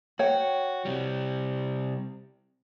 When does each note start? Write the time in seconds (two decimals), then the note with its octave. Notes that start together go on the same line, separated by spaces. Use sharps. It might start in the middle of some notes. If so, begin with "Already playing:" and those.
0.19 F#4 C#5 G5
0.85 C3 G3